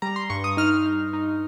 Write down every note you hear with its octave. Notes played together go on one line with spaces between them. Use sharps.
G3 A#5
C6
G2 C#6
D#6
D#4 F6
D#4
D#4